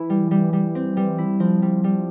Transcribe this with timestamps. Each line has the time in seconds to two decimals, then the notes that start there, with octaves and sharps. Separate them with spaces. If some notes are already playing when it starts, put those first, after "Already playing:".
Already playing: E3 E4
0.10 G3
0.31 G3
0.53 G3
0.75 C4
0.97 G3
1.18 E4
1.40 F3 C4
1.62 G3
1.84 G3